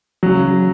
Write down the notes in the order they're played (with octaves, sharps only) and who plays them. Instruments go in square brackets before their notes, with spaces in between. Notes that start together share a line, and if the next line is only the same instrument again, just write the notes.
[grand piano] C#3 F#3